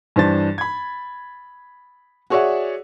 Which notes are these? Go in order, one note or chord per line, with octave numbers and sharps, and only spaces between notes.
G2 E3 D4 C5 A5 A6
B5 G#6
F#4 G#4 C#5 D5 E5 F#5